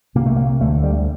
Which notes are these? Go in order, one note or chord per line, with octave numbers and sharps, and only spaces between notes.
C2 C3 A#3
A3
A#3
D2 D3 A3
G3